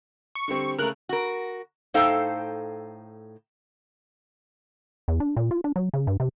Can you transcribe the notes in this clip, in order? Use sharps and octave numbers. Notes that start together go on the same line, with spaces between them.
C#6
D3 G3 C4
C#3 A3 A#4 F#6
F#4 A#4
A2 D#4 A4 C5 F5 G5
E2
D4
A#2
F4
D4
F#3
C#3
G2
C3